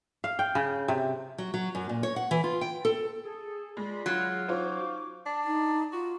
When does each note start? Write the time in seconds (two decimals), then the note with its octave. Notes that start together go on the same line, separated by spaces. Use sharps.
0.24 F5
0.39 G5
0.55 C#3
0.88 C3
1.38 F#3
1.54 F#3
1.75 F#2
1.89 A#2
2.03 C#5
2.16 F#5
2.31 E3
2.44 F4
2.61 G5
2.85 A4
3.24 G#4 A4
3.77 G#3 F4 D5 B5
4.06 F#3 F4
4.48 C#4 D#4 F4 F#4 C5 D6
5.26 D4
5.45 D#4
5.92 F4 F#4